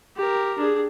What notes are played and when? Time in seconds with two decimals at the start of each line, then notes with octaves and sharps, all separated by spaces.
0.17 G4 A#4
0.58 D4 G#4